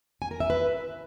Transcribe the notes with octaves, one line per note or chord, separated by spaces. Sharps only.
G#5
A#4
E5
B4